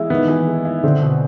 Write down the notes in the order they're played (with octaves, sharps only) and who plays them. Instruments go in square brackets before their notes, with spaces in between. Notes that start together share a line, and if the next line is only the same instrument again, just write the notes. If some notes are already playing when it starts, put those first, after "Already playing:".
Already playing: [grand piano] E3 G#3 B3 E4
[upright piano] D#3 [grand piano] B3
[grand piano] E3
G#3
E4
[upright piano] D3 [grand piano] C4
[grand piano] B2